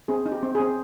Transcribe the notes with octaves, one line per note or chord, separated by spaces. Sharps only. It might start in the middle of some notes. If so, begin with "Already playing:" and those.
C4 G#4
D#4
G4
C4
C4 G#4